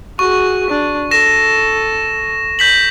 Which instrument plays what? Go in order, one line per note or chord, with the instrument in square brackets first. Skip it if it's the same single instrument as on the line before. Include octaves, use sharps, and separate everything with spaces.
[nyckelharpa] F#4 G#4 [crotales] C#6
[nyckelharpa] D4
[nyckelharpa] A4 [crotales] A#6 E7
[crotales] G6 B6 F#7